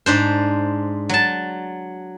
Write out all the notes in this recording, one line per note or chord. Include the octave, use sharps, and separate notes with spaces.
G#2 D4 C5
F#3 A5